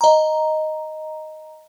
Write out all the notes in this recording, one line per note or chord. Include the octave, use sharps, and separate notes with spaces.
D#5 A#5